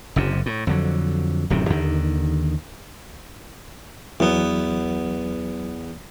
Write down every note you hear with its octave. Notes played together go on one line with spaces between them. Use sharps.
F#1 F#2 C3
A2
F2 D3 F#3
D1 F#2 C3 D#3
D#2 D3 D#3
E2 E3 F#3 B3